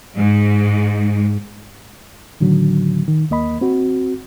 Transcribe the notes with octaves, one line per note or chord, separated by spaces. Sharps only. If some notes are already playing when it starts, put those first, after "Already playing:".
G#2
A2 D3 D#3 F#3
D#3
D#2 A#3 D#5 B5
C4 F#4